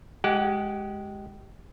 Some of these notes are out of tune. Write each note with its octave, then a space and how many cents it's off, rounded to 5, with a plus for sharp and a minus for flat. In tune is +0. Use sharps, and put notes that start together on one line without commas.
G#3 +0 G4 -20 F#5 +5